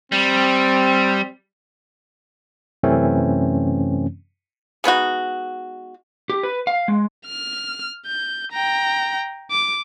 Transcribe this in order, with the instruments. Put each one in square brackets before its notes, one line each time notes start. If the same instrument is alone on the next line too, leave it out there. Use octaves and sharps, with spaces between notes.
[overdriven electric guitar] G3 [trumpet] C4
[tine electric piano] F#2 C3 E3 A3 C4 C#4
[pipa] G#3 B3 D#4 F#4
[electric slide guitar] G4
B4
F5
G#3
[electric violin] F6
G6
G5 A#5
D6